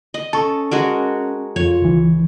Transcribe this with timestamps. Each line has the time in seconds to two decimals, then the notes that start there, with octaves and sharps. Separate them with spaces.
0.14 D#5
0.33 C#4 A4 A5 C#6
0.71 G#3 F#4 A#4
1.56 F2 F4 C#5
1.82 C#2 E3